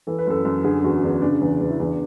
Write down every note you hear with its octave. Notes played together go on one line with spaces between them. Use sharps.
E3 A4
B4
F#2 A4
F#2
D3 G#4
E2 F#4
E2 D4
C#3 D4
E2
E2
E4
E2 D4